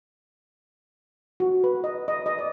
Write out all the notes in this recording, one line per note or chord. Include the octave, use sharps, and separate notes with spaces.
F#4
B4
D#5
D#5
D#5
D5